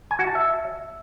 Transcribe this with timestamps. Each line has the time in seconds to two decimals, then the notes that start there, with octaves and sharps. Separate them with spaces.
0.11 G#5
0.19 F#4
0.27 A5
0.35 E5